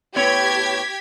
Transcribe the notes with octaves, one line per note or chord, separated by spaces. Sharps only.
A2 B3 G4 C#5 G#6 B6